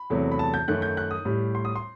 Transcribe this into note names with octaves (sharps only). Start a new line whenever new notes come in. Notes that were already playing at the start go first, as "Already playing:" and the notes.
Already playing: B5
E2 C3 F#3 A3
B5
A5
G6
F#2 D#3 A3 F#6
G6
F#6
D#6
A2 G3
C6
D#6
C6